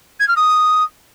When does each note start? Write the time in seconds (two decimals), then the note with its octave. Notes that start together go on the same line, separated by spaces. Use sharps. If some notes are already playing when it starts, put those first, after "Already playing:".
0.19 G#6
0.28 F6
0.36 D#6